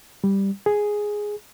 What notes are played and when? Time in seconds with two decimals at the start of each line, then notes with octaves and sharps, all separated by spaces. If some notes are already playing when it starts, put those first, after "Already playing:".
0.24 G3
0.66 G#4